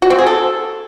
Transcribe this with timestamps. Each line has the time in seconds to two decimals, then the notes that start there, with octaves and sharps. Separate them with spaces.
0.02 F#4
0.10 C4
0.18 G#4
0.27 A4